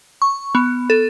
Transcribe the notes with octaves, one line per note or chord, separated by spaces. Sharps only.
C#6
B3
A4